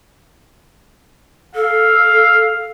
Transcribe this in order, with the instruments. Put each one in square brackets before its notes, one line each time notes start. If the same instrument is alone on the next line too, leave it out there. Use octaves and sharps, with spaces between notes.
[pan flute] A4 [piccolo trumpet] F5